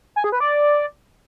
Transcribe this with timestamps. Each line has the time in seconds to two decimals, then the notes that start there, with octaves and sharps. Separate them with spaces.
0.16 G#5
0.24 G#4
0.32 B4
0.40 D5